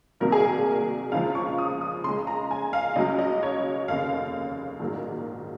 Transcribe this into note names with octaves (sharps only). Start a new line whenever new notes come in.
C2 C3 D#3 F#3 A#3 A#4
G#4
A#4
C#2 C#3 F3 G#3 F5
C#6
D#6
D#6
C#2 C#3 G#3 C6
A#5
G#5
F5
C#2 C#3 F#3 D#5
D#5
C#5
F1 D#2 C#3 F5
A#1 G#2 D#3 F#3